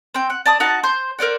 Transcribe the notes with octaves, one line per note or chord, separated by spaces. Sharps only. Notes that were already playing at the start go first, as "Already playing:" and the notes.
C4 G5
F#5
D5 A5 D#6
D#4 F#4 F#5 A5
C5 C6 G6
A#4 C5 D5 F#5